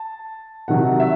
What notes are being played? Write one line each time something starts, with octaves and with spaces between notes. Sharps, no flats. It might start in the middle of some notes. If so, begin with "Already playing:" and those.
Already playing: A5
C3 D#3 F#3 F#5
E5